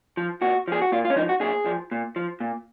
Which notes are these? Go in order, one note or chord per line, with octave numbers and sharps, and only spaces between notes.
F3
A#2 F#4
F3 G#4
F#4
A#2 F4
F4
C#4
F3 D#4
F#4
A#2 G#4
F3
A#2
F3
A#2